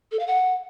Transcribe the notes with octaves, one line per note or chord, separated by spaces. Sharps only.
A4
F5
F#5